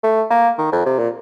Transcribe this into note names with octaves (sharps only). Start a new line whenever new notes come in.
A3
A#3
D#3
F2
C3
A#2